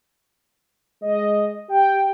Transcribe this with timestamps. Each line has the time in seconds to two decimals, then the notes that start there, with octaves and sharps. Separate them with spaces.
1.02 G#3 D#5
1.69 G4 G5